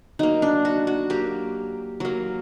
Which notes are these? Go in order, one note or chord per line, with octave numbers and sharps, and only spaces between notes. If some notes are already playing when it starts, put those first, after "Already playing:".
F#3 A#3 D#4
D4
F#4
F#4
F#3 A#3 G4
F#3 A#3